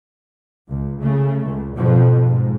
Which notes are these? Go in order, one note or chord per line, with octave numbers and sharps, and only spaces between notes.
C#2
C#3 A3
C#2
F2 G#2 B2 F3
G#2